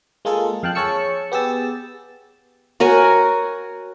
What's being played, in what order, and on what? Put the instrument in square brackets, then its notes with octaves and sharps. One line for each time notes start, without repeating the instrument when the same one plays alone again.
[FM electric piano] G#3 A#3 F4 G#4 A4
F2 F5 G5 A5 F#6
G#4 C#5 A5 C#6 E6 C#7
B3 G4 G#4 E6 A6
[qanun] F#4 A#4 C#5 G#5